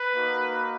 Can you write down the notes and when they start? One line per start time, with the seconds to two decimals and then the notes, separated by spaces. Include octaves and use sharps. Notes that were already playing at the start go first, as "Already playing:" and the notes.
Already playing: B4
0.14 A#3 D#4 F#4